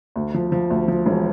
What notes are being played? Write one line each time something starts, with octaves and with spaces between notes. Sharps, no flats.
D2
F3
F3
D2
F3
E1